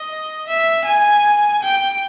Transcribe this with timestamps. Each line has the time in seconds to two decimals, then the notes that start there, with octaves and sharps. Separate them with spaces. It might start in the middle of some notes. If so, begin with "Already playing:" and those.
Already playing: D#5
0.47 E5
0.85 G#5
1.62 G5